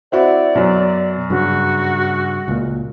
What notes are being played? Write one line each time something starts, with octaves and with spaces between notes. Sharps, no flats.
C4 E4 F#4 D5
F#2 B2 F#3
G2 C#3 F#4
C#2 A#2